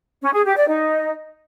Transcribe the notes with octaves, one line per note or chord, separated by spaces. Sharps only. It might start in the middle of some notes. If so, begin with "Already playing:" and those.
C#4
G#4
G4
D5
D#4